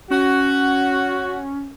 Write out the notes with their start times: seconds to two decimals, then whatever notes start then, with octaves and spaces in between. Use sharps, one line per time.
0.11 C#4 F#4